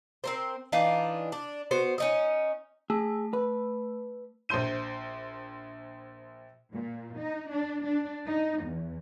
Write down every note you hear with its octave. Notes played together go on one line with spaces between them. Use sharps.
C4 A#4 C5
E3 D4 D#4 F4
D4
B3 F#4 C5
C#4 D#4 D#5
A3 G#4
B4
A#1 C5 C6 G6 D#7
A#2
D#4
D4
D4
D#4
E2